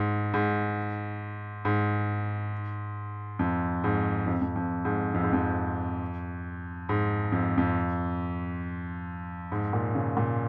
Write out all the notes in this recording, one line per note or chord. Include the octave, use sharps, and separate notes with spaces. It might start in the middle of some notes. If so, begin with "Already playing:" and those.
Already playing: G#2
G#2
G#2
F2
G#2
F2
F2
F2
G#2
F2
G#2
F2
G#2
F2
F2
G#2
A#2
C#3
A#2